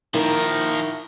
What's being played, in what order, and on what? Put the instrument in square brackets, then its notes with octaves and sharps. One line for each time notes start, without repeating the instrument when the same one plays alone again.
[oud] D#3 [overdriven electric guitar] F3 A#4 [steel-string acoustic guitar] E4